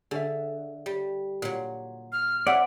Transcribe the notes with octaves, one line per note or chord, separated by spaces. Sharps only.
D3 G#4 C#5 E5
G3
A#2 F#3
F6
C4 C#5 D5 E5 F#5